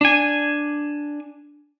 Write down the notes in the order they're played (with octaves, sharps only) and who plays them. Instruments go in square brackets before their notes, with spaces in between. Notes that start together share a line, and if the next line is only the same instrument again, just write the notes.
[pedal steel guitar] D4 G#5